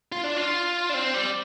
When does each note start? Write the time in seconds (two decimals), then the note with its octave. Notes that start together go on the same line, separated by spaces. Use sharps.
0.12 F4
0.24 D4
0.37 F4
0.89 D4
0.94 C4
1.14 G3